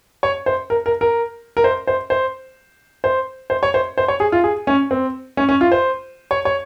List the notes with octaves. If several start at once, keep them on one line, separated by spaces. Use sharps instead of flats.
C#5
C5
A#4
A#4
A#4
A#4
C5
C5
C5
C5
C5
C#5
C5
C5
C#5
G#4
F4
G#4
C#4
C4
C#4
C#4
F4
C5
C#5
C#5